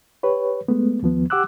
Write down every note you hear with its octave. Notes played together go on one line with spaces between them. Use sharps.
G4 B4 C#5
G#3 A3 B3
D#2 F3 B3
G4 F#5 D6 E6 F#6